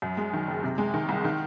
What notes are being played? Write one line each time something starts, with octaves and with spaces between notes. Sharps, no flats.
F#2
G#3
D#3
F#1
C3
G#3
D#3
C2
D#3